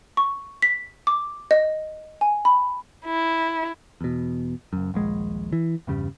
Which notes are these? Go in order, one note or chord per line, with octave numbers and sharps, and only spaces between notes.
C#6
B6
D6
D#5
G#5
B5
E4
E2 B2
F#1 F#2
D#1 A#1 G#3
E3
E2 G2 C#3 G3